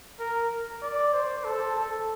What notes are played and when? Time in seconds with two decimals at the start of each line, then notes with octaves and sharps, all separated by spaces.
0.19 A#4
0.82 D5
1.13 C5
1.44 A4
1.76 A4